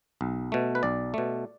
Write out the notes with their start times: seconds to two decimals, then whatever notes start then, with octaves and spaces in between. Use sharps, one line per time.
0.21 B1
0.52 B2 A3
0.75 B4
0.83 B1 D5
1.14 B2 A3